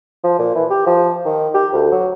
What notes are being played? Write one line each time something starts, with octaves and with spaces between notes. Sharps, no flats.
F3
A#2
E3
G4
F3
D#3
G4
D2
F#3